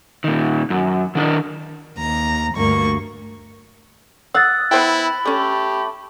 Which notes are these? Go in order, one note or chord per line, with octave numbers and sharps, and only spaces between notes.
A#2 D#3
F#2
D#3 D4 A#4
D#2 A#5
D2 G2 A#3 C#6
F5 F#5 D#6 E6 F#6 A6
B3 E4 C5 G5 B5
A3 C#4 G4